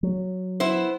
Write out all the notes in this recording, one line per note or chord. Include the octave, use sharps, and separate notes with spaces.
F#3
B3 E4 C5